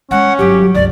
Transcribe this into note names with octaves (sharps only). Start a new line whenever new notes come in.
G#3 C#4 F#5
G1 F#3 G4
G1 C#2 D5